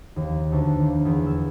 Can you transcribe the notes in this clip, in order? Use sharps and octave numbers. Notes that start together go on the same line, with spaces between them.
D#2
D2
D#2
E2
E6